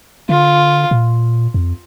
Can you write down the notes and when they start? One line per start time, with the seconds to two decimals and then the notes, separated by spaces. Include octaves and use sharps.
0.29 D3 F4
0.91 A#2
1.54 F2